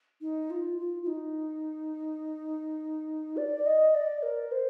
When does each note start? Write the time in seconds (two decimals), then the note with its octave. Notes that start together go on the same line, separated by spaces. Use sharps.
0.21 D#4
0.50 F4
0.78 F4
1.03 F4
1.07 D#4
3.37 D5
3.66 D#5
3.95 D5
4.23 A#4
4.52 C5